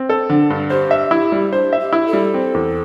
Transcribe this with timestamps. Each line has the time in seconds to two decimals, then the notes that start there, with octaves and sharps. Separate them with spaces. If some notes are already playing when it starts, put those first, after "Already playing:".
Already playing: C4
0.09 A4
0.29 D3
0.50 G2
0.70 G4 C5
0.91 E5
1.11 E4
1.32 G3
1.52 D4 C5
1.73 E5
1.79 G4
1.93 E4
2.06 A4
2.13 G3
2.34 C4
2.54 E2